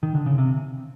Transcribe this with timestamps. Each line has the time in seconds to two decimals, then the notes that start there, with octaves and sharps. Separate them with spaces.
0.03 D#3
0.15 D3
0.26 C#3
0.38 C3